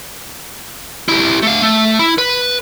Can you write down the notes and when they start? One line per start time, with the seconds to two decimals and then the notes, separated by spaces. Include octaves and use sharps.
1.08 E4 G4
1.43 A3 F5
1.62 A3
1.99 E4
2.18 B4